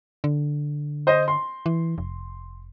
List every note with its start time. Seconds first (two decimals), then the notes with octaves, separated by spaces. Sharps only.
0.24 D3
1.07 C5 D#5
1.28 C6
1.66 E3
1.98 F1